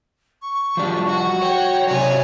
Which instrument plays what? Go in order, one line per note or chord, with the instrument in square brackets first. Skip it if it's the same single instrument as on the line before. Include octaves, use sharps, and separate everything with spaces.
[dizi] C#6
[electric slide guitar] F3 G3 [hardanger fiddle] D4
[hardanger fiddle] F#4 [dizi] C#6
[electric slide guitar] C#5 [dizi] G5
[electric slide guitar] C3 F#3 [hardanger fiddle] C#5 G#5 [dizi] D5